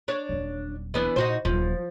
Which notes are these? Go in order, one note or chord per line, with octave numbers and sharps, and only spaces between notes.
D4 C#5
D#1 F#3
E3 B3 D4
A#2 D#4 F#4 C5
D#1 F3 F#3